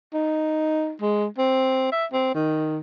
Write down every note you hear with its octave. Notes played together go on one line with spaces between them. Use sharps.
D#4
G#3
C4
E5
C4
D#3